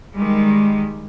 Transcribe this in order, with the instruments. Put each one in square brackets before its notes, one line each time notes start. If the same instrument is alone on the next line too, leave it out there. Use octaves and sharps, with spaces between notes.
[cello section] D#3 G3 G#3